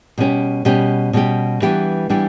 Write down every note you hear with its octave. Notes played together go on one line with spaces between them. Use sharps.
B2 G3 C#4 G4
B2 G3 C#4 G4
B2 G3 C#4 G4
E3 G3 B3 D4 G4
E3 G3 B3 D4 G4